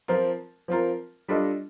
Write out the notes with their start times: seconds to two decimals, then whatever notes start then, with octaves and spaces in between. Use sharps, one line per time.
0.08 F3 C4 F4 A#4
0.68 F3 C4 F4 A#4
1.28 G3 D4 F4 A4 D#5